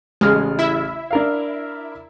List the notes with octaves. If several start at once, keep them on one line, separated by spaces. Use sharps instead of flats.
A1 C#3 G#3 F6
E4 E5
D4 A#4 F5